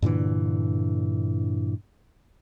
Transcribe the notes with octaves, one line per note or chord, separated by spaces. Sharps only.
G2 A#2 D3 E3